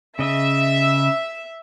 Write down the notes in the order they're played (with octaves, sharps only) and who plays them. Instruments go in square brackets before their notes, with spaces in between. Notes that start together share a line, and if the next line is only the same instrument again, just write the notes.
[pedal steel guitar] C#3 D#5 [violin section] E5